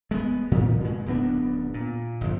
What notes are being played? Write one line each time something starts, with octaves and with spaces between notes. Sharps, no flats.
G#3 B3
A2 D#3 F3
A#2 G#3
D1 F#2 B3 D4
A#2
G1 F2